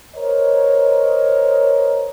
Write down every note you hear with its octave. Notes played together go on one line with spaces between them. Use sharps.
A#4 C5 C#5 D#5